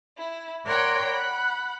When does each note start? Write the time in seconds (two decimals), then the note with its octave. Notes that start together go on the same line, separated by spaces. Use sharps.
0.17 E4
0.65 A#4 C#5 D5 F#5 G5 C6
1.08 F#5 B5